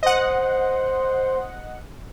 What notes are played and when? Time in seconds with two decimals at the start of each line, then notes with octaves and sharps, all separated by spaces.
0.03 C5 D#5 F#5